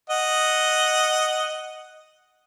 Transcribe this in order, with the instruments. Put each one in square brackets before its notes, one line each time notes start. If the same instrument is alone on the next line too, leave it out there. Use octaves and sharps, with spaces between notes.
[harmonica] D#5 F#5